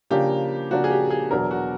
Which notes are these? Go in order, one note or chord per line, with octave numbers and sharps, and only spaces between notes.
C#3 F3 A#3 D4 G4
C#3 F3 A#3 D4 F#4
G#4
G4
G#4
E2 B2 F#3 B3 D4 A#4
F#4